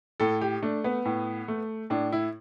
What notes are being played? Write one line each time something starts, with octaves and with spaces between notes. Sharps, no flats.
A2 A4
G4
A3 D4
B3
A2
A3
A2 D4
E4